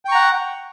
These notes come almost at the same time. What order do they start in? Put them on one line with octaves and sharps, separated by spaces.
G5 C#6 A#5 F#5